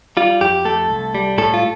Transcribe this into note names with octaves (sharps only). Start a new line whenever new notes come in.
G3 F4
F2 G4
A3 A4
C2
G3
A2 A4
F4